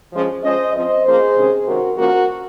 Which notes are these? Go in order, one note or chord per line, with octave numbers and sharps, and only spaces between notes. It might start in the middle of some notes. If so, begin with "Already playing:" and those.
F3 G#3 C#4
F3 G#3 C#4 C5 D#5
F3 C4 C5 D#5
F3 A#3 C#4 G#4 C5
C3 D#3 G#3 C#4
C3 D#3 G#3 C#4 F#4 A#4
F3 A#3 C#4 F#4 A#4